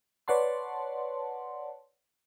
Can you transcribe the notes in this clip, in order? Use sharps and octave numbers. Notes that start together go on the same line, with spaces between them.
B4 C#5 D5 F#5 A5 C6